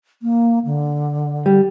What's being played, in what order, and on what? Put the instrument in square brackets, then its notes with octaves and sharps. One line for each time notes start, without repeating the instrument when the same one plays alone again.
[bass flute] A#3
D3
[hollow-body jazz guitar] G3